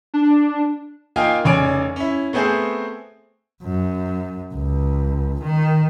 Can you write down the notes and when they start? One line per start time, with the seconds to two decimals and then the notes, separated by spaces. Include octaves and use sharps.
0.14 D4
1.16 A#3 D#4 F4 F5 G5 G#5
1.44 F1 C#3 C#5 D5 G#5 D7
1.96 C#4 E4
2.33 A3 B3 C4 G#4 C5
3.63 F#2
4.54 C#2
5.43 D#3